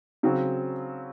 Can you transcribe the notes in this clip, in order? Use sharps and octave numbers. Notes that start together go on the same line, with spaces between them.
C#3 F#3 C4